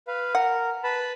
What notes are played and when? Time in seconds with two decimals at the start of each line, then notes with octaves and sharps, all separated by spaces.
0.08 B4 F5
0.35 A#4 F#5
0.84 B4 A5 B5